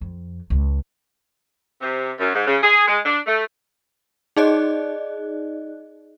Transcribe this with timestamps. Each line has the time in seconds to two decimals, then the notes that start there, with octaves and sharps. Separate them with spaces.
0.01 F2
0.50 C#2
1.81 C3
2.20 F#2
2.34 G#2
2.45 C#3
2.61 G#4
2.87 G#3
3.05 D4
3.27 A3
4.36 D#4 G#4 D5 D#5 F#6